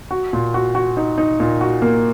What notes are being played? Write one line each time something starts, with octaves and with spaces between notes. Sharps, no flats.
F#4
A#2
F#4
F#4
D#4
D#4
A#2
F#4
A#3